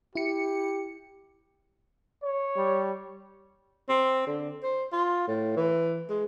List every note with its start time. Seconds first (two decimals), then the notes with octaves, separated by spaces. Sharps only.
0.15 E4 G4 C#7
2.23 C#5
2.57 G3
3.89 C4
4.27 D3
4.63 C5
4.92 F4
5.27 A2
5.57 E3
6.09 G#3